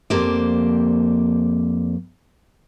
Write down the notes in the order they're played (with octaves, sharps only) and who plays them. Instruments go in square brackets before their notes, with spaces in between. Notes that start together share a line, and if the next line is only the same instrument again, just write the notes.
[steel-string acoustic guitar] F2 A#3 G4 C5 D5